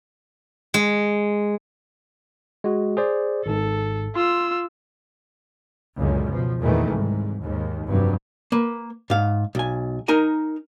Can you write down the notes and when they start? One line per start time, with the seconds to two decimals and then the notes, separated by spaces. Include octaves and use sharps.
0.74 G#3
2.64 G#3 F#4
2.97 G#4 C5 D5
3.46 G#1 G#2 A4
4.16 F4 C6 E6
5.98 C#2 F#2 A#2 D3
6.29 B2 F3
6.60 E2 A#2 D#3 E3 G#3 A3
6.91 C2 G#2
7.41 D#2 G#2
7.85 F1 G2 F#3
8.52 A#3 B4
9.10 G#2 F5
9.55 B1 G#5
10.08 D#4 A#4 G#5 A#5